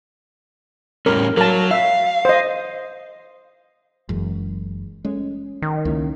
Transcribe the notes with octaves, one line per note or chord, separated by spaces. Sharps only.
A2 G3 C#4 A#4
F#3 A#4 A5
E5 F5
C5 D#5
F#1 F#2 E3 G#3
G#3 A3 C#4
D#3
C#2 A#3 C#4 E4